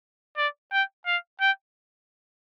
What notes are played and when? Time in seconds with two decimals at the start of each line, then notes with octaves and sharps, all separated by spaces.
0.37 D5
0.72 G5
1.06 F5
1.41 G5